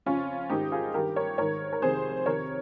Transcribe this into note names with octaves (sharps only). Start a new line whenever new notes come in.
F2 C#3 C#4 F4
G#2 D#3 D#4 G4
F4 G#4
G2 D#3 G4 A#4
A#4 C#5
G#2 D#3 A#4 C#5
A#4
F2 C3 D#3 G#4 C5
F2 C3 D#3 A#4 C#5